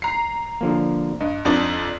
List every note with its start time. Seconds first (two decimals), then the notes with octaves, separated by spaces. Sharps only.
0.02 A#5 C7
0.61 D3 F3 A#3
1.21 G2 D#5
1.45 F2 D4 D#4